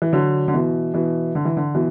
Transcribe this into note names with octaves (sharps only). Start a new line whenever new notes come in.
E3
D3 F#3
D3
B2 E3
B2 E3
D3
E3
D3
B2 E3